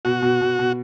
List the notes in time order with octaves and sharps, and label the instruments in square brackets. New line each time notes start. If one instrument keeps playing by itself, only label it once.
[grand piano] B2 [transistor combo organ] F#4
[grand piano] B2
B2
B2